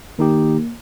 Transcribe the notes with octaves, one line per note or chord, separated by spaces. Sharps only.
D#3 A#3 D#4 G4